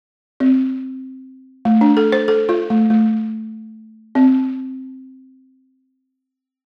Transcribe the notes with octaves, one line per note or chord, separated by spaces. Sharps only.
C4
A3
D4
A4
C5
A4
F4
A3
A3
C4